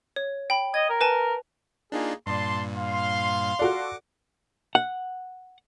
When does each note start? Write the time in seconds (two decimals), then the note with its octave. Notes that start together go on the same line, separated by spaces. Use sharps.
0.16 C#5
0.50 G5 B5
0.74 D#5 G#6
0.89 A#4
1.01 B4 G#5 A5
1.92 A#3 D4 D#4 F4 G#4
2.26 G2 A#2 D5 A5 C6
2.77 F5 C6
3.59 F#4 A4 D5 F#5 D6
4.75 F#5